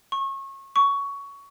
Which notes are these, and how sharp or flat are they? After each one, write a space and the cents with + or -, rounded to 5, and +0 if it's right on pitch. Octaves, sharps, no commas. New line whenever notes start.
C#6 -30
C#6 +15